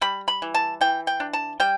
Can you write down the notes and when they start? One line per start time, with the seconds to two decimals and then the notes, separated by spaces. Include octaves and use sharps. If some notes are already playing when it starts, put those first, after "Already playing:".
0.01 G3 B5
0.28 B5
0.42 E3
0.54 A5
0.81 E3 G5
1.07 G5
1.20 D4
1.33 A5
1.60 G3 G5